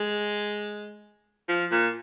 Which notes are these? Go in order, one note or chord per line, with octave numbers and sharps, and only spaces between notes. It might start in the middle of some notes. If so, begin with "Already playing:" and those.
Already playing: G#3
F3
A#2